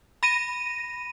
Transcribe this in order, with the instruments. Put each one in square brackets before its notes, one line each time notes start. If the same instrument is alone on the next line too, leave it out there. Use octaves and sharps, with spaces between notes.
[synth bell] B5 A#6 D#7